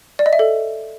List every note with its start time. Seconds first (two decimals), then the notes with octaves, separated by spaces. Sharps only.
0.19 D5
0.26 D#5
0.33 E5
0.39 A4